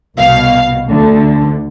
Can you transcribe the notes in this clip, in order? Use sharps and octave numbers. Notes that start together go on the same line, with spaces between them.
C2 B2 F5
D2 D3